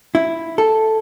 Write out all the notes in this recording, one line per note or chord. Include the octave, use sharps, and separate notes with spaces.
E4
A4